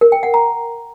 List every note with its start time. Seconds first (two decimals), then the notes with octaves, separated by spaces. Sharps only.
0.01 A#4
0.12 G5
0.23 F#5
0.34 A#5